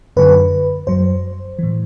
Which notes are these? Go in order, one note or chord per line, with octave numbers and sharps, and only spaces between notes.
F#2 D3 F#3 B4
F#2 F#3 C5
A2 E3